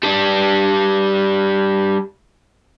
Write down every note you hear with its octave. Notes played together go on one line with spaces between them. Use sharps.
G3 D4